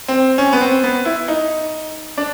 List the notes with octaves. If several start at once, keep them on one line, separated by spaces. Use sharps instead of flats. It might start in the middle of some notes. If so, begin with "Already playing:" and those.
C4
C#4
B3
C4
B3
E4
D#4
D4